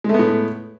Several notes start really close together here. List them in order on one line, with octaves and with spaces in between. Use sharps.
G#3 A3 B3 A2